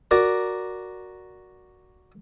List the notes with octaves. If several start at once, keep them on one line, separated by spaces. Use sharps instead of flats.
F#4 A#4 D5 A#5